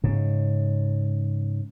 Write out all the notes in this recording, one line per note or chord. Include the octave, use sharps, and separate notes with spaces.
G#2 C#3